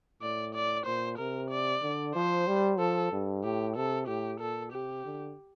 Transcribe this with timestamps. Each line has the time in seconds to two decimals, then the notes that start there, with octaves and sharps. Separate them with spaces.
0.22 A2 D5
0.55 D5
0.86 A#2 C5
1.18 C3 A#4
1.50 D5
1.82 D3
2.15 F3 C5
2.47 G3
2.79 F3 A4
3.12 G2
3.44 A2 G4
3.76 C3 A4
4.08 A2 G4
4.40 A#2 A4
4.72 C3 G4
5.05 D3